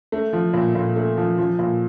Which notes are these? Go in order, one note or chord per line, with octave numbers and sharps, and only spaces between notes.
A3
F3
A#2
A#2
A3
F3
F3
A#2